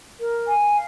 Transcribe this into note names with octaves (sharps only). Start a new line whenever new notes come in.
A#4
G#5
F5